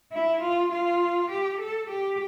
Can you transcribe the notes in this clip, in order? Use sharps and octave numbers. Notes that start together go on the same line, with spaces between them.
E4
F4
F4
G4
A4
G4